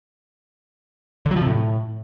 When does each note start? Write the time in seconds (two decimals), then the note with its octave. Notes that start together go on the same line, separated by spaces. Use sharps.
1.26 D3
1.31 F#3
1.36 F3
1.42 C3
1.47 A2